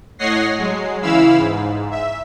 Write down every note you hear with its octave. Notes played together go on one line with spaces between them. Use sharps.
A2 C#5 D#5 F#5 A#6 C7
F#3 G#3
C#3 E3 E4 F5 B5 E6
G#2
E5